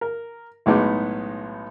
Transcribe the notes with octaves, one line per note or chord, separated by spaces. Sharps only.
A#4
B1 A2 G#3 B3 D#4 D6